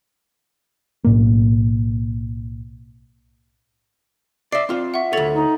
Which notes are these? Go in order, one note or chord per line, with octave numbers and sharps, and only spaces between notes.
B1 A2 A#3
D5 E5 C7
C4 F4
E5 F#5 C#6
D2 A4 C#5 A6 F7
D#4